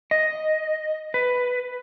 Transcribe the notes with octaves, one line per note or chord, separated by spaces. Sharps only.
D#5
B4